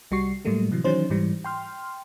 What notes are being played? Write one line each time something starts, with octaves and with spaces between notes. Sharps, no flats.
C2 G3 F#4 C#6 C7
A2 F#3 G3 A3 A#3
C3 E3 F#3
D#3 E3 F#3 C#4 D#4 C5
G#2 E3 G3
G5 C6 F6